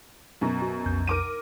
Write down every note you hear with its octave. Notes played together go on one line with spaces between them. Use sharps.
F#2 B2
F#4
B1 F2 G6
A#4 D6 D#7